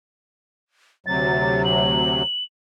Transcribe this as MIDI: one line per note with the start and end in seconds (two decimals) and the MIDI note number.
1.06 2.23 38
1.06 2.23 48
1.06 2.23 54
1.06 1.63 93
1.65 2.44 102